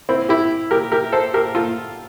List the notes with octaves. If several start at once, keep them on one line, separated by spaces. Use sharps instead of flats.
C4 E4
E4 G4
G4 A#4
G4 A#4
A4 C5
G4 A#4
F4 A4